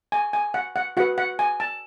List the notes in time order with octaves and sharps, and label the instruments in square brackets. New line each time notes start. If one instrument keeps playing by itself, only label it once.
[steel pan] G#5
G#5
F#5
F#5
F#4 B4 F#5
F#5
G#5
A5